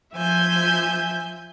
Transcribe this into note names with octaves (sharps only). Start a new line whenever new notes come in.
F3 E5 G#5 G6